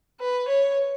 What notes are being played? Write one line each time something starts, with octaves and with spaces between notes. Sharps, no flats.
B4
C#5